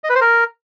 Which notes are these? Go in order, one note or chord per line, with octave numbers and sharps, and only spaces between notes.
D#5
B4
C5
A#4